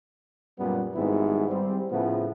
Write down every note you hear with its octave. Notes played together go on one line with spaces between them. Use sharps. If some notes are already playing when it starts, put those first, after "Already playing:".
F#2 A#2 F#3 G3 B3
G#1 G#2 G3 B3 E4
G3 C4
A2 C#3 F3 A3 B3